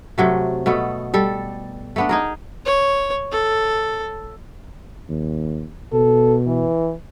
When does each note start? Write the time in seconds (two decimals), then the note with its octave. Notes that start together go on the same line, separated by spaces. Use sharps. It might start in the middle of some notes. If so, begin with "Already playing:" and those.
0.18 C3 F#3 A3
0.66 B2 A3 B3 A4
1.14 G3 A4
1.96 A3 B3 D4
2.09 D#4 G#4 A#4
2.66 C#5
3.31 A4
5.09 D#2
5.93 B2 A4
6.46 E3